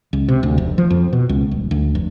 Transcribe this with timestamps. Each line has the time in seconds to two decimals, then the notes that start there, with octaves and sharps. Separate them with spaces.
0.13 C#2
0.28 C3
0.43 D2
0.58 F1
0.78 F3
0.90 F2
1.13 B2
1.29 C#2
1.51 D#1
1.71 D2
1.95 F1